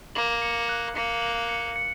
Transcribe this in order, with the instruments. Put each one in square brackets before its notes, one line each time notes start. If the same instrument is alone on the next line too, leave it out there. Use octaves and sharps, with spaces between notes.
[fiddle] A#3 [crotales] F#7
[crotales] C#7
F#6
[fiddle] A#3 [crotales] C#7
[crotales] F#7
C#7
C#7